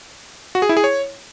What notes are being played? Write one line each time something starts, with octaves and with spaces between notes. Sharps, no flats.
F#4
G#4
E4
G#4
C#5